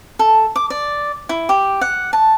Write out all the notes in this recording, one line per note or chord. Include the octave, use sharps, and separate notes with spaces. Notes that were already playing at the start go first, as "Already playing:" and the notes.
A4
D6
D5
E4
G4
F#5
A5